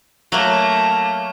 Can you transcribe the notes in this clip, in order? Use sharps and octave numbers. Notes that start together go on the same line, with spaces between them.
F#3 A3 A#3 A#5